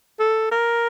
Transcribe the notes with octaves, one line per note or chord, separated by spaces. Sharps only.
A4
A#4